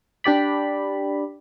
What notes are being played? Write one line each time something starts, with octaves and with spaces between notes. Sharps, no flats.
D4 G4 D5 B5